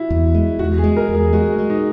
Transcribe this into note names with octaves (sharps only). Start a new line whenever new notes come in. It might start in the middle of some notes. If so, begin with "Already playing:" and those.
Already playing: E4 F#4
E2
G#3
E2 F#4
G#4
G#3
A#4
E2
G#4
G#3 F#4
G#3
D#4